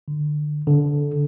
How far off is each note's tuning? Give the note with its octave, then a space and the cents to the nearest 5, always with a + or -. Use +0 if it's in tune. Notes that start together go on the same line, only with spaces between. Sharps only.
D3 +25
D3 -15